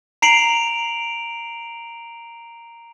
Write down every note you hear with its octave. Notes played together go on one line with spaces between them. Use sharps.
A#5 C7 D7 F7 F#7